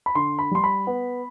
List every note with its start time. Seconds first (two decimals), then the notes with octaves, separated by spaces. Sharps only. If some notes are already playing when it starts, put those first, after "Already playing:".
0.06 B5
0.15 D3 C6
0.39 B5
0.51 G3 C6
0.64 B5
0.87 B3